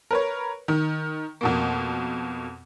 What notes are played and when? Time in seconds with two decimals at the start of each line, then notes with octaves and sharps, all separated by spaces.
0.11 A#4 B4 C#5
0.68 D#3
1.41 F2 B2 A#3